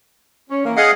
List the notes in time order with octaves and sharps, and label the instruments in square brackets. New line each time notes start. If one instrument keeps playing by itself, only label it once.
[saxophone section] C#4
E3 A#3
[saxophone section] G#4 [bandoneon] D#5 F5 F#5